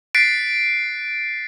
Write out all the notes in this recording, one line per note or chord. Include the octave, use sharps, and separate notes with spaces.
F#6 A6 B6 C7 D7